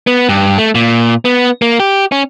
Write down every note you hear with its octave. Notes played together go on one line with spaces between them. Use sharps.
B3
G2
A3
A#2
B3
A#3
G4
C#4